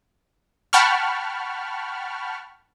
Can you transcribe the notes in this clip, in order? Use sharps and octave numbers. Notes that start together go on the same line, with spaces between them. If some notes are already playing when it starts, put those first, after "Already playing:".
F#5 G5 A5 B5 C#6 F6